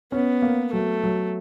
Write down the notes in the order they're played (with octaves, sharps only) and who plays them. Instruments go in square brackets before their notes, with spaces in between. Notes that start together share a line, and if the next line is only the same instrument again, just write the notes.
[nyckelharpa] B3 [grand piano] C#4
[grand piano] A#3
[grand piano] F#3 [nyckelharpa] A3
[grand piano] F#3